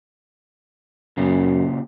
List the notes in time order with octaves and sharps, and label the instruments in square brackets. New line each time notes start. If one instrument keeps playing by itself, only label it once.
[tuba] F#2 [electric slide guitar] A#2 C#3